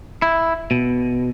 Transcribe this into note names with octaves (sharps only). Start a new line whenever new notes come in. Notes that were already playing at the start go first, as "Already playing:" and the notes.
E4
B2